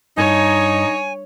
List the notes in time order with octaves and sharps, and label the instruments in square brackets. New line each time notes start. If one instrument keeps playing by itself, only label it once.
[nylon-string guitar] G2 [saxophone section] D#4 [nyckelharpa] C#5 [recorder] G#5